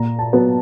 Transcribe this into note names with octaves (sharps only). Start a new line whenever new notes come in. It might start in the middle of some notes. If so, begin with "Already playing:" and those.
Already playing: A#2 A#5
A5
F#3 B3